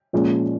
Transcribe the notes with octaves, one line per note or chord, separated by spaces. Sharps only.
A#2 F3 G#3 C#4